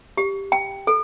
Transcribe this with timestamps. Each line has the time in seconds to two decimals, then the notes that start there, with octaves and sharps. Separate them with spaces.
0.17 G4
0.52 G5
0.87 A4